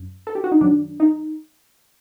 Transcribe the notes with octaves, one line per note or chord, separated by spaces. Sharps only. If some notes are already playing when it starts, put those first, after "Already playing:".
Already playing: F#2
A4
G4
F#4
D#4
F#2 D#3 F#3 D4
D#4